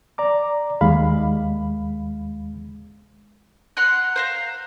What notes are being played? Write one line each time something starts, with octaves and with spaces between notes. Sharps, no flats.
D5 A#5 D6
D#2 G#3 F5 B5
F#5 A#5 C6 F#6
C5 F5 A#5